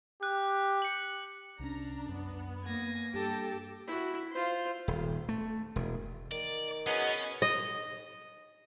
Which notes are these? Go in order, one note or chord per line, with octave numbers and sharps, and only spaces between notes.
G4 F#6
C#7 F#7
C2 C#4 D4 A#5
F#2 B3
A#3 G#5 A#6
G2 G4 A4 G5 A5
E4 F#4
F4 C5
D#1
A3
E1
D#3 D5
F#3 B3 C#4 G#4 D#5
D#5